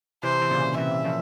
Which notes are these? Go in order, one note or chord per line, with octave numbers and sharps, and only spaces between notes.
C3 E3 C5
E3
A#2 C#3
C3 E3 E5
C#3 F3